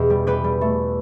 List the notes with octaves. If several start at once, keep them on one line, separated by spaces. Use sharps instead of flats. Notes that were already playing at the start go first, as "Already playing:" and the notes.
Already playing: E2 B2 G4
G3
G3 G4 B4
G3
A3